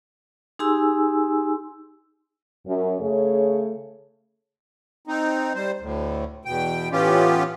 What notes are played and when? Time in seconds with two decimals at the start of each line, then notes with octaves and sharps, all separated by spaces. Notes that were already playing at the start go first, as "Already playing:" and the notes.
0.59 D#4 G4 G#4 G#5 C6 E6
2.67 F#2
3.01 C#3 A3 G#4 C#5
5.07 C4 D#4
5.55 G3 C5
5.81 D2 A2
6.45 E2 B2 G5
6.92 A2 E3 B3 C#4 F4 G4